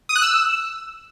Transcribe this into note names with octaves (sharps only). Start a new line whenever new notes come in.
D#6
F#6
E6